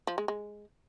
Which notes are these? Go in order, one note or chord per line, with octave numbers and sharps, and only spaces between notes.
F3
G#3
G#3